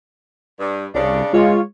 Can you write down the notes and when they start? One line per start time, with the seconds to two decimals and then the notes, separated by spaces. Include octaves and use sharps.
0.59 G2
0.95 C2 C#3 D4
1.33 G#3 F4 C#5